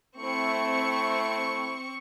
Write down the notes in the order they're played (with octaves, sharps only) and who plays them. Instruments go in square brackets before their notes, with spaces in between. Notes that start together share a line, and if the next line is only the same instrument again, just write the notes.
[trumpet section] A3 E4 [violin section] C4 C#6